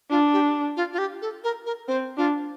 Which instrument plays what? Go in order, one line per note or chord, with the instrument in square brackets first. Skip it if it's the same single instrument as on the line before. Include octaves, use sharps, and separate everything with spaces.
[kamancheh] D4 [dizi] F4
[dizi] G4
F4
F4
G4
A4
A#4
A#4
[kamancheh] C4 [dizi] C5
[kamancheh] D4 [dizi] F4